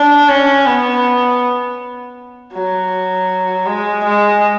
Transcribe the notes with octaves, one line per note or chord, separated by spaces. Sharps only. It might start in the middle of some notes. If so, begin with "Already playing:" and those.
Already playing: D4
C#4
B3
F#3
G#3
G#3